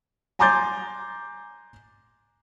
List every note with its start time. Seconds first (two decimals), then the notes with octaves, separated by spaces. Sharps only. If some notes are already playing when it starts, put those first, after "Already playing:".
0.39 G#5 A#5 C6 D6 G6 A6